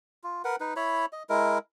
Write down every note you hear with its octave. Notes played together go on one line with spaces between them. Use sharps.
F4
A#4 B4 F#5
D#4 B4
E4 C#5 B5
D#5
G#3 E4 A#4